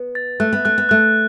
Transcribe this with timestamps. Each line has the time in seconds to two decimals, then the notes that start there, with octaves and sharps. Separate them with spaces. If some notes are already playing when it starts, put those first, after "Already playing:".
Already playing: B3
0.15 A6
0.40 A3 F#6
0.53 B3
0.65 A3 F#6
0.78 B3
0.89 A3 F#6